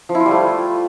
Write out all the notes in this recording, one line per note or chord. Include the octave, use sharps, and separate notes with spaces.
F3
E4
F4
G3
A3